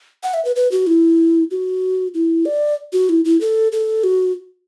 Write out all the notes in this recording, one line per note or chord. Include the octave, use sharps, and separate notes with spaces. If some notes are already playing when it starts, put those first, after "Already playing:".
F#5
E5
B4
B4
F#4
E4
F#4
E4
D5
F#4
E4
E4
A4
A4
F#4